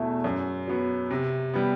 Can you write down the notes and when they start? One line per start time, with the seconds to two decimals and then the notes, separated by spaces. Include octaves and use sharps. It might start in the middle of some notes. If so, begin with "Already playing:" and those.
Already playing: E2 B2 A3 E4
0.24 F#2
0.68 F#3 B3
1.11 C3
1.54 G3 B3